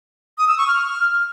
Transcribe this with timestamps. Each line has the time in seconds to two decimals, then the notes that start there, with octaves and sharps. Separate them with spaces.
0.38 D#6
0.48 E6
0.58 C#6
0.68 F6